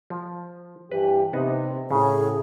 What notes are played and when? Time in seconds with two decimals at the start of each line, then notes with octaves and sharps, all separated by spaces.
0.10 F3
0.91 G2 E3 G4 B4
1.33 C3 B3 D#4
1.90 A2 C#3 G#4